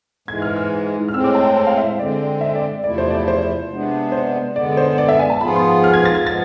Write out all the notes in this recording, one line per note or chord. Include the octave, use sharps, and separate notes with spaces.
G#2 E3 G#3 G#6
F6
F6
F6
A2 G#3 C4 E6
D6
A5
A5
A5
F5
E5
C5
D3 G#3 C4 D5
E5
D5
E2 C3 F3 A3 E4 D5
C5
D5
C5
C3 G#3 B3 D4
C5
D3 G#3 B3 D5
C5
D5
E5
G#5
A5
G#2 F3 B3 F4 G#4 B5
C6
F6
G#6
A6
G#6
F3 G#3 B3 A6